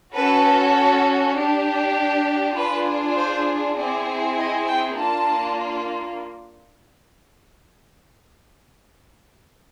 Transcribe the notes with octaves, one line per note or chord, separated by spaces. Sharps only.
C#4 F#4 A4 B4
D4 G4
D4 F4 G#4 B4
C5
C4 E4 G#4 D5
D#5
G5
A#3 D4 F4 A5